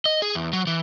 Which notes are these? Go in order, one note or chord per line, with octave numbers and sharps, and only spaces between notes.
D#5
G#4
E2
F#3
E3